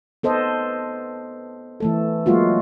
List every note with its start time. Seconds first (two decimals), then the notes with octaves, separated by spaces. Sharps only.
0.23 B3 A4 C5 D#5
1.80 E3 A3 A4
2.26 F#3 G#3 A#3 F4 F#4